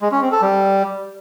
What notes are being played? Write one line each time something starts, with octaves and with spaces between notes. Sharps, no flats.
G#3
C#4
C4
A4
G3